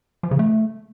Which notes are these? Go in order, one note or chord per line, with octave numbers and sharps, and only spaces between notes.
F3
C#3
A3